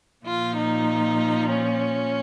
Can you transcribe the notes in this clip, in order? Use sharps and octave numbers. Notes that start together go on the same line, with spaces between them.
A#2 F3 F4
D#4
C#4